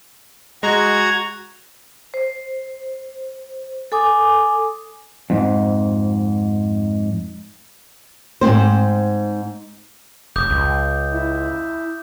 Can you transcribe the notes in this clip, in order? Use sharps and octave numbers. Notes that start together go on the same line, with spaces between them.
G#3 F#4 A#5 G#6
C5
A4 G#5 D6 D#6
F2 G#2
G#2 C3 C4 C5
F1 D6 D#6 G6
C#2
E4